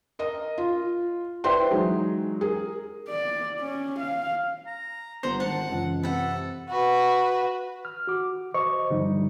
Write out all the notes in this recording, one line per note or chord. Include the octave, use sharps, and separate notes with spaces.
A#4 D#5
F4
E4 B4 C5 D5 G5 C6
E3 F#3 G#3 D#4
G#4 A#4
D5
C#4
F5
A#5
G1 C5 F#5 A#5
G#1 F#5 A5
C#2 F#2 E3
C3 A4 B4 F#5
F#4 B4
F6
F#4 D6
C5 D#5 C#6
G2 D3 F3 G3 D#4